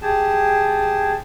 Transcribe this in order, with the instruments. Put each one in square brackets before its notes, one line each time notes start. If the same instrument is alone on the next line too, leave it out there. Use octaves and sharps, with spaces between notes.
[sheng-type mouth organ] G4 G#4 A5